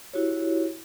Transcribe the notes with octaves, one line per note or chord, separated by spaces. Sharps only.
E4 F#4 G4 C#5